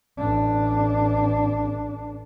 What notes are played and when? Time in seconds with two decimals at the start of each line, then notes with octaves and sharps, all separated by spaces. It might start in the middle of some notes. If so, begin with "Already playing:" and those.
0.18 A1 D4